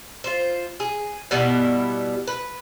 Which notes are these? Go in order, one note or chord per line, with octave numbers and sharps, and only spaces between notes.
F4 C5
G#4
B2 G3 B3 E4
B4